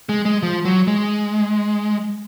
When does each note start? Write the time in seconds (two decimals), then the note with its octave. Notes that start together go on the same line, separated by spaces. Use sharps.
0.09 G#3
0.25 G#3
0.43 F3
0.65 F#3
0.87 G#3